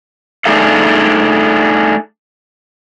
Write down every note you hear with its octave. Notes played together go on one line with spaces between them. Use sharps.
A3 D4 D#4 G#4 A4 F5